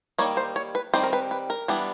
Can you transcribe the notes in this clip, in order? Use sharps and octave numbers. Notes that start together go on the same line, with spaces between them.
D#3 G3 A#3 C#5
C5
C#5
B4
D#3 G3 C4 C5
A#4
B4
B4
A#4
E3 G3 B3 D4